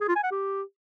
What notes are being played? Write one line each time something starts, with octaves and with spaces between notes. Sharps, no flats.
G#4
F4
G#5
F#5
G4